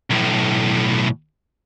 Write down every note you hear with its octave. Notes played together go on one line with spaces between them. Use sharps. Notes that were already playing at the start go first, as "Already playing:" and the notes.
B1 A2